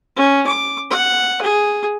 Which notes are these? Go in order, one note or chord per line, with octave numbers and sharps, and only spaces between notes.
C#4
D6
F#5
G#4